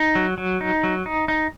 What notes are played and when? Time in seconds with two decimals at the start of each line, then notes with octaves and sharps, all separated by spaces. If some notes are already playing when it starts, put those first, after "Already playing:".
Already playing: D#4
0.15 F#3
0.38 F#3
0.61 D#4
0.83 F#3
1.06 D#4
1.28 D#4